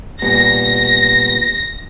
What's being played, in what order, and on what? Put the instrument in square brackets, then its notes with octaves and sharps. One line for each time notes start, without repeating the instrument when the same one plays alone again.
[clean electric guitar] A#2 G3 B3 [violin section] A#6